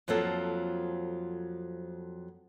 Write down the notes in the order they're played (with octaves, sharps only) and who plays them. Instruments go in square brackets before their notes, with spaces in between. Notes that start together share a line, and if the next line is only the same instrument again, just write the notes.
[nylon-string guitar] F2 F3 F#3 A#3 A4